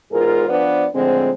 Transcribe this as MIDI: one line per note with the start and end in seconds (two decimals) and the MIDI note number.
0.12 0.47 40
0.12 0.47 44
0.12 0.47 65
0.12 0.47 68
0.12 0.47 70
0.48 0.84 53
0.48 0.84 59
0.48 0.84 62
0.48 0.84 71
0.48 0.84 72
0.48 0.84 74
0.95 1.30 45
0.95 1.30 50
0.95 1.30 53
0.95 1.30 56
0.95 1.30 60